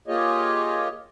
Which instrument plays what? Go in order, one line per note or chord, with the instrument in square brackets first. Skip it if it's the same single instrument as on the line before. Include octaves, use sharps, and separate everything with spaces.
[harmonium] A#3 F4 G4 G#4 C#5 D#5